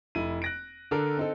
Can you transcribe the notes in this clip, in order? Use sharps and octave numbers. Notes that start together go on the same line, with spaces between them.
F1 E4 D#7
F#6 A#6 D7
D3 D4 A4 A#4
C4 D#4 A4